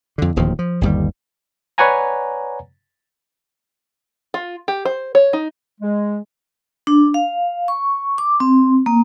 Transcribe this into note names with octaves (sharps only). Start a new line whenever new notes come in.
F2 D3
D1 D#2 F3
F3
G1 D#2 G3
B4 C#5 D5 F#5 G#5 A#5
F4
G4
C5
C#5
D#4
G#3
D4
F5
C#6
D6
C4
A#3